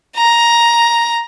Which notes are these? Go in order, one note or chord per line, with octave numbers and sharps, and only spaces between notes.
A#5